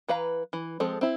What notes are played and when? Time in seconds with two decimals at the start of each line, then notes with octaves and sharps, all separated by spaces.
0.08 E3 B4 F5 A#5
0.53 E3
0.80 F3 G#3 C4 A4
1.01 C4 E4